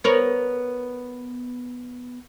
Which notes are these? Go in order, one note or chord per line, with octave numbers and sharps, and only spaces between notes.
B3 A#4 C#5